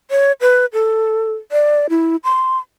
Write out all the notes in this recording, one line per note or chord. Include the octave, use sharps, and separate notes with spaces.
C#5
B4
A4
D5
E4
C6